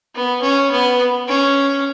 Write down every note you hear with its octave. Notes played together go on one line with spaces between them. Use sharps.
B3
C#4
B3
C#4